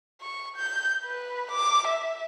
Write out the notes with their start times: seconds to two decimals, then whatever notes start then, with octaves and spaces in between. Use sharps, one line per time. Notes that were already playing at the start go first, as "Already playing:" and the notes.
0.22 C#6
0.57 G6
1.05 B4
1.51 D6
1.88 E5